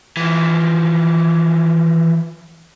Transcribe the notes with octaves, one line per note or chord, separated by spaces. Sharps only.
E3 F3